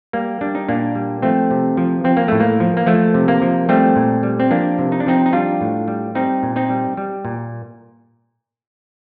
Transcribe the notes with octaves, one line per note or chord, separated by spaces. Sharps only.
G3 A#3
G3 D4
D#4
A#2 A#3 D4
G3
F3 A3 C4
C3
F3
F3 C4
A#3
A2 A3
A#3
F3
A#3
F3 A3
C3
A#3
F3
G3 A3 C4
A#2
G3
C4
F3 A#3 D4
C3
D#4
D4
F3 C4 D#4
D#4
G3 D4 F4
A2
G3
G3 C4 D#4
A#2
C4 D#4
G3
G3
A#2